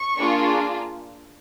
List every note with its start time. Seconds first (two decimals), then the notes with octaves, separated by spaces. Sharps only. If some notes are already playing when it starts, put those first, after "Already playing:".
Already playing: C#6
0.17 A#3 D4 F4 G#4